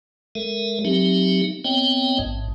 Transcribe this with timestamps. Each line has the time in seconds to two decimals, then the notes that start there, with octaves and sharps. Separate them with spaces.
0.35 G#3 A4 A#4 E5
0.85 F#3 C4 D#4 G4 E5
1.64 B3 C4 C#5 D#5 G5
2.19 A1 G#2